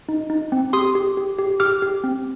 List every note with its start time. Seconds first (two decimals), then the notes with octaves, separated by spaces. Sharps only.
0.09 D#4
0.30 D#4
0.52 C4
0.73 G4 C6 D#6
0.95 G4
1.17 G4
1.38 G4
1.60 G4 D6 F6
1.82 G4
2.04 C4